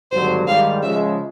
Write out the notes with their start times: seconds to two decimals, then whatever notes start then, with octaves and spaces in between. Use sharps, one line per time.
0.11 G#1 G2 D3 F#3 C5
0.47 G#2 D#3 G3 F5
0.82 C#3 F3 G#3 E5